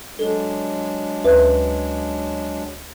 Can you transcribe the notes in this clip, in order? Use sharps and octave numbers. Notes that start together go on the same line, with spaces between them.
F#3 G#3 D4 A4
D2 B4 E5